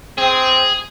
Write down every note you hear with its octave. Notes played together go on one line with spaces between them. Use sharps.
C4 G#4